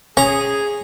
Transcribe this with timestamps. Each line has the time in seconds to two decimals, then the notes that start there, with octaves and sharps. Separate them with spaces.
0.17 C#4 G#4 A#5